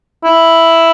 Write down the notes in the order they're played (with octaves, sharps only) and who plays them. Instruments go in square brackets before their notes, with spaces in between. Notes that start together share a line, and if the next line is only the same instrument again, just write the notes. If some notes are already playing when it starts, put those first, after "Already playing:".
[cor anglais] E4